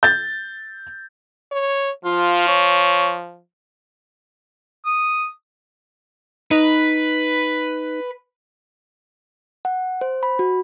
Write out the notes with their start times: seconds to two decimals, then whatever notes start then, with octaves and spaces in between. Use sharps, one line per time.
0.03 G6 A6
1.52 C#5
2.05 F3 F4
2.48 C#5
4.85 D#6
6.51 D#4 B4
9.65 F#5
10.01 C5
10.23 B5
10.39 F#4